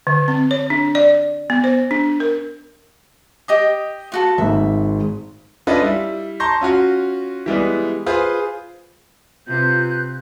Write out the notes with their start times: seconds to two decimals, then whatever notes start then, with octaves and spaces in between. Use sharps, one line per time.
0.07 D3
0.28 C4
0.51 C#5
0.70 D4
0.95 D5
1.50 B3
1.64 C5
1.91 D4
2.20 A#4
3.48 G4 D#5 D#6
4.12 F4 F#4 A4
4.38 G#1 G#2 E5
5.67 C#4 D4 F4 A4 B4 D#5
5.82 G3 E4
6.40 A5 A#5 C6 C#6 G6 A#6
6.61 C#4 F4 F#4
7.46 E3 G3 G#3 B3
8.06 F4 G#4 B4 C5
9.48 C3 F4 B4 F#6 G6